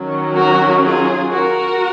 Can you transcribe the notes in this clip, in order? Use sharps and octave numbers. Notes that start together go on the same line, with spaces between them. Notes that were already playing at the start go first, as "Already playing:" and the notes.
Already playing: D#3 F#3 C#4
F#4 A#4
F4 G#4
F#4 A#4